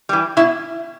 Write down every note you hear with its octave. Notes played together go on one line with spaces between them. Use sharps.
E3 G3
B2 E4